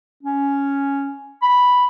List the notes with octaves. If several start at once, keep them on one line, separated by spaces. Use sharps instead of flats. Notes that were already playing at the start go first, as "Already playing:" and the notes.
C#4
B5